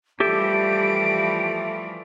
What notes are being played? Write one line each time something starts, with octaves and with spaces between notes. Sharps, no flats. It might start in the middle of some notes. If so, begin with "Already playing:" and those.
E3 F3 G3 A3 G4 A4 D7